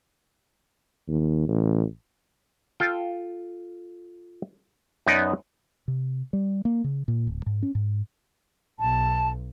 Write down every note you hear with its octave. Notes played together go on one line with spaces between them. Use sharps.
D#2
A1
F4 A4 G5
F#2 B3 D#4 B4 D5 D#5
C3
G3
A#3
C#3
A#2
D1
G#2
C#4
G#2
B1 A5